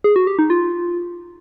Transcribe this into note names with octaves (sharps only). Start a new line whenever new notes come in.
G#4
F#4
G4
D#4
F4